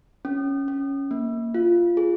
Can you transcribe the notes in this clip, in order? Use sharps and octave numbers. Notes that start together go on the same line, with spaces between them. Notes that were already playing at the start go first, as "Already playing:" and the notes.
C#4
C#4
A#3
F4
G#4